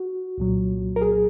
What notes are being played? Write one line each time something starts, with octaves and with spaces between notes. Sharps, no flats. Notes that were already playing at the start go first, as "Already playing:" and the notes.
Already playing: F#4
C2 A#2 F#3
A#4
G#4